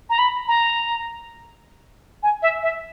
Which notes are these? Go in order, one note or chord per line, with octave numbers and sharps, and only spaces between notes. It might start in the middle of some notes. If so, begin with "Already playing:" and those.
A#5
B5
A#5
G#5
E5
E5